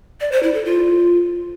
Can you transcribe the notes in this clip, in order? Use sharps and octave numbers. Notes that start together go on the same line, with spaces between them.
D5
C5
E4
A4
F4